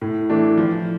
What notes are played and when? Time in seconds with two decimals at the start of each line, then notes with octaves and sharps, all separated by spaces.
0.01 A2
0.30 E3 A3 D4
0.58 F3